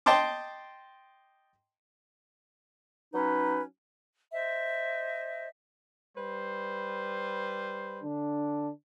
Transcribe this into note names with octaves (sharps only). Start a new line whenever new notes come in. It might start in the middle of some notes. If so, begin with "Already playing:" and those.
D#5 G5 A5 C6 D6
F#3 C#4 D#4 B4
C5 D#5 E5
G3 B4 C5
D3 D4